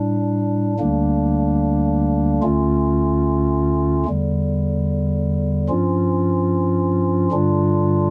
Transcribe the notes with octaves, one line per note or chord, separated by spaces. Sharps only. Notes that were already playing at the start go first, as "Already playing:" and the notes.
Already playing: A2 G3 D4
D2 D3 G3 A#3 D4
D2 D3 A3 C#4 F4
E2 D3 G3
G2 F3 C#4 F4
G2 D3 G3 D4 F4